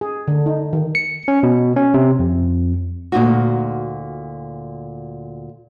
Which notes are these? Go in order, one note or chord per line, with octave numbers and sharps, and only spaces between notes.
G#4
D3
D#4
D#3
C#7
C#4
B2
C#4
C3
F2
D2 A#2 D#4 F#4